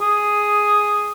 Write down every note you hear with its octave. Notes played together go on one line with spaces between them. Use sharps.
G#4